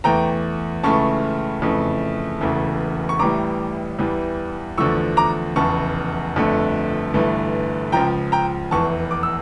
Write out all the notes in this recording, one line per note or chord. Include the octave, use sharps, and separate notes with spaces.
E2 E3 A3 G5 A#5
C#2 C#3 E3 A3 A5 C#6
F2 C#3 E3 A3
E1 E2 C#3 E3 A3
C#6
A1 A2 E3 G3 A#5 D6
E2 E3 G3
E2 D3 F3 A3 C#6 E6
A#5 D6
F1 E2 C#3 A5 C#6
G1 F2 D3 A3
G1 G2 E3 A3
C#2 C#3 F3 G5 A#5
G5 A#5
F1 E2 E3 A5 C#6
D6
E6